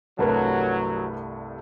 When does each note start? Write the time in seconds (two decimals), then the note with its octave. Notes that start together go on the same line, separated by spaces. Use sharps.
0.19 C2 G2 F#3 A3 A#4 B4 A5